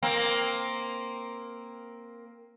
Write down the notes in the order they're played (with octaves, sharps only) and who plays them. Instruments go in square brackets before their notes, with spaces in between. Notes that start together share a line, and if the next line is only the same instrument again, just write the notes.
[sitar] A#3 C4